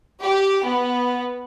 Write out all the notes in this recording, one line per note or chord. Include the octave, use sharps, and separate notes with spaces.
G4
B3